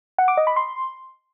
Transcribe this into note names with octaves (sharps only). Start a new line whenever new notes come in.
F#5
D6
D#5
B5
C6